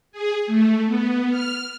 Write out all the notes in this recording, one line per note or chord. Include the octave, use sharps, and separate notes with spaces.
G#4
A3
B3
F6